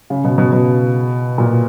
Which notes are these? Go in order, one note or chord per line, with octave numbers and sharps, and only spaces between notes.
C#3
B2
B2
B2
A#2